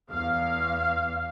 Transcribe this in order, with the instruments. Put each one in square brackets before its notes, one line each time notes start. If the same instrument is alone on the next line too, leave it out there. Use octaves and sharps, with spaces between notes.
[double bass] E2 [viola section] F5